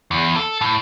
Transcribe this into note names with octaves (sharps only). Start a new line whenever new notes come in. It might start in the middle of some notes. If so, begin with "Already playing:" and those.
E2
A4
A2